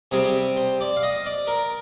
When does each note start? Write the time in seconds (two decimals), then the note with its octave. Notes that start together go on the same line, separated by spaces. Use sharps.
0.12 C3 G3 C4 G#4
0.56 C5
0.80 D5
0.96 F5
1.03 D#5
1.26 D5
1.47 A#4